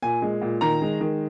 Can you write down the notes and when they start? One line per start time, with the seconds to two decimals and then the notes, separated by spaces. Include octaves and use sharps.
0.02 A#2 G#5
0.22 G#3
0.42 A#2
0.61 D#3 A#5
0.81 G#3
1.01 D#3